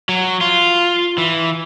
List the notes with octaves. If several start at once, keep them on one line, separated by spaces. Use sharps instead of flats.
F#3
F4
E3